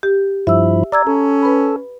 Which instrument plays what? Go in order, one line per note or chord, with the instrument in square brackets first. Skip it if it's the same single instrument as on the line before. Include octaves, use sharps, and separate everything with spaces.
[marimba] G4
[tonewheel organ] G2 F3 E4 [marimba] E5 E6
[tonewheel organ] D5 [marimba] A#5 E6 G#6
[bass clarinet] C#4 [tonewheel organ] A4
[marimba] B4 B5